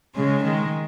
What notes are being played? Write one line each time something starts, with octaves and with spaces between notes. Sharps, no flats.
C#3 G#3
D#3 G#3